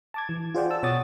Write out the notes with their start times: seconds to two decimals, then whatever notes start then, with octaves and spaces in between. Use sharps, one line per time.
0.14 A5 D6 G#6
0.29 E3
0.55 F4 G#4 C5 D5 F#5 G5
0.70 A5 E6
0.83 B2 C#5 F#5 D6 D#6 A6